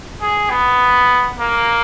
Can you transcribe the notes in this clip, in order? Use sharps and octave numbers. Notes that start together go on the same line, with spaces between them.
G#4
B3
A#3